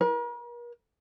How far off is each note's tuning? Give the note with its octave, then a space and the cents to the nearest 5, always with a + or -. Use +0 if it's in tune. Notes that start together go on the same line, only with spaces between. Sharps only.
A#4 +45